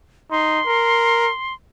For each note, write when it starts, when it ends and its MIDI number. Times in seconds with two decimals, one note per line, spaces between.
0.31 0.60 63
0.31 1.54 84
0.66 1.30 70